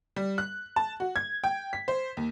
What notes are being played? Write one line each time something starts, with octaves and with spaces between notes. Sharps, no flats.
G3
F#6
A5
F#4
G#6
G5
B6
C5
D#2